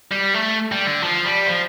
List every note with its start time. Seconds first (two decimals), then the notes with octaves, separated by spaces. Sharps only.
0.12 G3
0.34 A3
0.72 G3
0.87 D3
1.02 F3
1.25 G3
1.47 F3